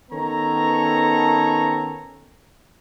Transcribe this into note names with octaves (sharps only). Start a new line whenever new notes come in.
D#3 B3 C#4 A4 C#5 A#5